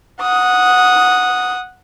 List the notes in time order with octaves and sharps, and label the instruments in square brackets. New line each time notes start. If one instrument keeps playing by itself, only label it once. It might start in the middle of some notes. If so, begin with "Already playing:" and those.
[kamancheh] F#5 D#6